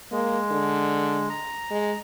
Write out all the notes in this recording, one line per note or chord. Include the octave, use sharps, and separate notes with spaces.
G#3 A#3
D3
A#5
G#3